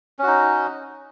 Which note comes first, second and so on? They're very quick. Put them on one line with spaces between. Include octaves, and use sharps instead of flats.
C#4 F#4 D#4